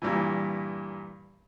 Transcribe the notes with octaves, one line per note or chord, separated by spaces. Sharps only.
G2 A#2 E3